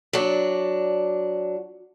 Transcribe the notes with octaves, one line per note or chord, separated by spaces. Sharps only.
F#3 D4